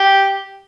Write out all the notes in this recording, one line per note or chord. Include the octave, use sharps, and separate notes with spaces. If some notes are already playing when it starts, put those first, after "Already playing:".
Already playing: G4